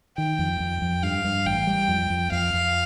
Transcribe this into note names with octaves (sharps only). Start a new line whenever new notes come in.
D#3 G5
F2
F2
F2
G2 F5
G2
A1 G5
G3
F2
F2
F2 F5
F2